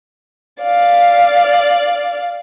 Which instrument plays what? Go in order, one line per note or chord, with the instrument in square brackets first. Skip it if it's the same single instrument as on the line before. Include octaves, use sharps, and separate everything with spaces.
[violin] D5 F5